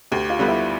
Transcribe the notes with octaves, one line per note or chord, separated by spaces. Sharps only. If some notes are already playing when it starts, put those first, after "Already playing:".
D2 G4 G5
F4 F5
D3 G3 B3
E4 E5